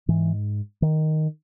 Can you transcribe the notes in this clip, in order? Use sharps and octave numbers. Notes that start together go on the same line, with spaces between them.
G#2 E3
D#3